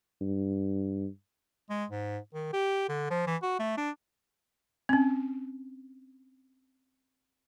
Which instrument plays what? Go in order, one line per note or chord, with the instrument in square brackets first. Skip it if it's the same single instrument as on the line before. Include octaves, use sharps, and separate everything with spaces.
[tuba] G2
[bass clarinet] G#3
G#2
D#3
G4
D3
F3
E3
F#4
A3
D4
[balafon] C4 C#4